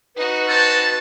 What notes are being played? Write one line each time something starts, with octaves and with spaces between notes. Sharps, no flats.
D#4 F#4 B4
C4 A5 A6